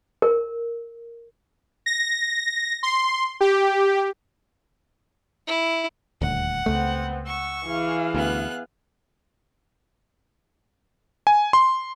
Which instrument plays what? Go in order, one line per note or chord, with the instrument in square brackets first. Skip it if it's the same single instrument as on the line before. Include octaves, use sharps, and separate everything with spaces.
[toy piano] A#4
[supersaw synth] A#6
C6
G4
[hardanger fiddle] E4
[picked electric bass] D#1 D2 [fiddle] F#5
[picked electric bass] C#2 A3 [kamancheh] B3 C4
[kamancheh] F#5 E6 [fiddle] C#6
[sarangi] E3 [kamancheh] G#4 F5
[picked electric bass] D2 [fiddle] B3 F#6
[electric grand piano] G#5
C6